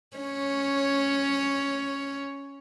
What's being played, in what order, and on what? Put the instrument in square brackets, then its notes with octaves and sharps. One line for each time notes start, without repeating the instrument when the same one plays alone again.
[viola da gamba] C#4 C#5